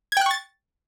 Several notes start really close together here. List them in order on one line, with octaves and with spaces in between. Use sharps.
G#6 G5 F#6 C#6 A6